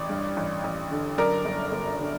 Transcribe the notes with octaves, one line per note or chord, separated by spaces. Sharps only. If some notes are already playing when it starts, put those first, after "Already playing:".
Already playing: A1 D5
G2
A1
A1
D3
F#2 A#4 D5
G1
G1
D3